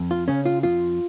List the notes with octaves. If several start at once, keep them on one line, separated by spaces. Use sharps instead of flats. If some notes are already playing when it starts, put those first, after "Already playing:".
Already playing: F2
F4
C#3 C#4
F4
F2 F4